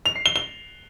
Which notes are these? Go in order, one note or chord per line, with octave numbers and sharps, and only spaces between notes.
F7
C7
G7
G7